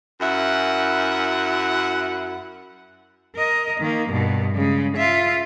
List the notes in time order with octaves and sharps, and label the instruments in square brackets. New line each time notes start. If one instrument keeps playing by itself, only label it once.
[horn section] F#2 E4 F#5
[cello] A#4 D#5
D#3 A#3
G2 B2
C#3 G#3
F4 E5